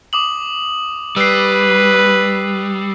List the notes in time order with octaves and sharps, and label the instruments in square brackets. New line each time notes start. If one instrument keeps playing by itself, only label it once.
[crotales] D6 D#6 F#7
[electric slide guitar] G3 [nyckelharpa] B4 [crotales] E6 C7